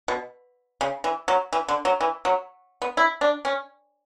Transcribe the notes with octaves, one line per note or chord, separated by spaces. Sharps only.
B2
C#3
E3
F#3
E3
D3
F#3
E3
F#3
B3
E4
D4
C#4